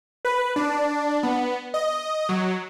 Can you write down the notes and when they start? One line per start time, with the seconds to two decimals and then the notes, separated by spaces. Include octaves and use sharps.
0.25 B4
0.56 D4
1.23 B3
1.74 D#5
2.29 F#3